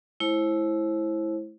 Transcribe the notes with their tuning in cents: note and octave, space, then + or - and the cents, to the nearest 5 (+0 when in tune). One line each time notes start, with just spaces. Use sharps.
A3 -40 E4 +0 C5 +30